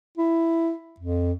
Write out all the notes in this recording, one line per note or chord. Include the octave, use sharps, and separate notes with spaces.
E4
F2